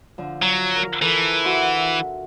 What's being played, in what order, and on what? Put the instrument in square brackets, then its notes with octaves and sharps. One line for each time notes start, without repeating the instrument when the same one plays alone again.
[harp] D3 F3
[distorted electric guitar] F#3
[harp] A#4
[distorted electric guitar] E3 [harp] A4 A#4
[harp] F#4 E5 C6